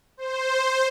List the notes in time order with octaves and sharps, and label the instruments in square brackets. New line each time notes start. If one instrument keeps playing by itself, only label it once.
[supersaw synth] C5